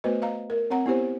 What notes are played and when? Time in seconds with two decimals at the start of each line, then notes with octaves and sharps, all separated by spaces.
0.04 A3 B3 F#4 B4 C5 D#5
0.22 D#5 F5 A#5
0.50 A#4
0.70 C4 C#5 F#5 A#5
0.86 B3 E4 G4 C5 C#5